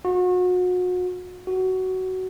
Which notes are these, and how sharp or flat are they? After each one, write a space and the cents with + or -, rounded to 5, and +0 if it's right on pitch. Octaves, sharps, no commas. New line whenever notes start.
F#4 -35
F#4 +15